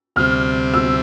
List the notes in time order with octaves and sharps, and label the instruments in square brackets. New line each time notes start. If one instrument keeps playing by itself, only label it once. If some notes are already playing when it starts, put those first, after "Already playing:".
[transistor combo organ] D2 C3 G3 C4 [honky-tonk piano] F6
[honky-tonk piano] E6